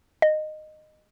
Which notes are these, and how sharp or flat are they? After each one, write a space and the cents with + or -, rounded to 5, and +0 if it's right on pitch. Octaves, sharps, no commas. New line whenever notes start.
D#5 -15